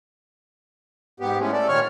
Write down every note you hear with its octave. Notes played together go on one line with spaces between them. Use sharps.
G#2 B3 G4
E3 G#3 A3 C#4
A4 D5
A#2 D#3 C#5 C#6 F6